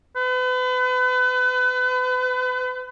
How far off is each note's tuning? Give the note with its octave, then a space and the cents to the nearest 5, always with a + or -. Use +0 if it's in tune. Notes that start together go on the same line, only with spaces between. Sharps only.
B4 +35